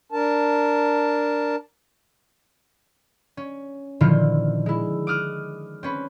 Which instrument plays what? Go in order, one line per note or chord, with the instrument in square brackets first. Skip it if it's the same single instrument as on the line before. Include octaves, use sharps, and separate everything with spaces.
[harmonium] D4 A#4 A5
[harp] C#4
A#2 D3 D#3 F3 E4 F4
G#3 E4
D6 D#6 F6 F#6
C4 C#4 B4